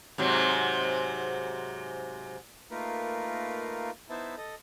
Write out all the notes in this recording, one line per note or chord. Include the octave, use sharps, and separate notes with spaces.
G#2 C3 F#3
A3 A#3 D#4 F4 A#4 B4
B3 D#4 E4 C5 E5 A5
A4 D#5